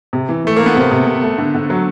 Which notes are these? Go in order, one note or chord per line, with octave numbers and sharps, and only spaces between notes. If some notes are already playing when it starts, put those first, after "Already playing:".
C3
E3
E3 A3
E3 A#3
B3
C3 A#3 C4
C3
C3
A3
D3
D3
F#3